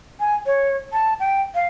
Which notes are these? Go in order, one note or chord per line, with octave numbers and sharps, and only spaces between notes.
G#5
C#5
A5
G5
F5